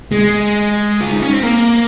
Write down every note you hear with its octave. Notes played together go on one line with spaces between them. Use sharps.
G#3
F4
D#4
C#4
C4
A#3